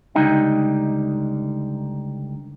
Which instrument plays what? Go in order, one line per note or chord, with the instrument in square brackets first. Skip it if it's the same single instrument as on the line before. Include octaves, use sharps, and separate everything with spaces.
[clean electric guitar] C#2 D3 G3 D#4 D#5 G5